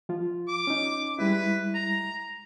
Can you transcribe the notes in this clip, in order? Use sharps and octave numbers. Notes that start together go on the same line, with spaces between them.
F3 F4
D6
C#4 D#4
G3 G#3 E4 B4
A#5